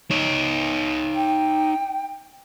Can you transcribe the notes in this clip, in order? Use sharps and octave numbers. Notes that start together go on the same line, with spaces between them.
D#4 C#5
G5